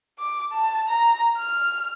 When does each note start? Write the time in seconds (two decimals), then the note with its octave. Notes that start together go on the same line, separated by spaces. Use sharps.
0.19 D6
0.52 A5
0.88 A#5
1.37 F6